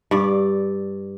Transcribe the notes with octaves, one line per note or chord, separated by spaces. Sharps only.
G2 D5